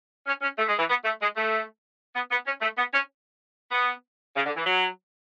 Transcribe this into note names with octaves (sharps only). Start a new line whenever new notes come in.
C#4
C#4
A3
G#3
E3
B3
A3
G#3
A3
B3
B3
C#4
A3
B3
C#4
B3
C#3
D3
E3
F#3